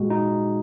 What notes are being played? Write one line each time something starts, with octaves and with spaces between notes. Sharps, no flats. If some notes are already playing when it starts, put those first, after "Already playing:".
Already playing: A#2 G#3 F#4
D#4